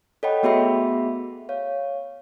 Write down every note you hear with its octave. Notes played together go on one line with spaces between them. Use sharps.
A4 C#5 D#5 F#5 G5 B5
A3 B3 F#4 G#4 E5 B5
C#5 F5